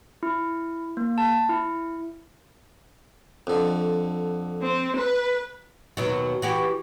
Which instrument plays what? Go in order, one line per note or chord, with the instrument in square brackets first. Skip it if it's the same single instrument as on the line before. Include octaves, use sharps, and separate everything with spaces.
[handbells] E4
A#3
A5
E4
[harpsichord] F2 D3
[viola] C4
B4
[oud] D#2 B2 F#3
E3 F#4 G4